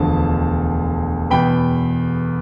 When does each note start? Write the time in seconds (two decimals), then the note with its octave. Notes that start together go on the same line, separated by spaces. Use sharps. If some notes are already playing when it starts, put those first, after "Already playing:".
Already playing: E1 D2 D3 F3 A5
1.30 E2 B2 B3 G5 B5